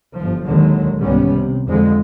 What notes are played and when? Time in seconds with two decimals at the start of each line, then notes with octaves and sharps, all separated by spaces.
0.15 G1 F3
0.45 D#2 A#2 D3 D#3 F#3 G#3
1.00 C2 G#2 G3 B3 C#4
1.35 C3
1.68 F2 D3 F3 G#3